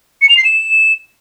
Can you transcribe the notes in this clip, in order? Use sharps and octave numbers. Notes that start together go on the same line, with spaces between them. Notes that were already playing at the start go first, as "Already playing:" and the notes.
C#7
F7
C7
E7